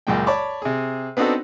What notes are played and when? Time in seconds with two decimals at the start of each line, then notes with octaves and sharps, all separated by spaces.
0.07 C#2 F#2 A#2 G#3 G5
0.27 C#5 D5 A5 B5 C#6 D6
0.62 C3 G#4
1.17 B3 C4 D4 D#4 F#4 A4